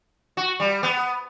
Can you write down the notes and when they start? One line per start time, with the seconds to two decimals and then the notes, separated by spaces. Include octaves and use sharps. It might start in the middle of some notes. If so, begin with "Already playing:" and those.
0.37 F#4
0.60 G3
0.83 B3